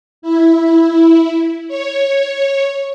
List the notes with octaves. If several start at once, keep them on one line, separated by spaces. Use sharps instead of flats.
E4
C#5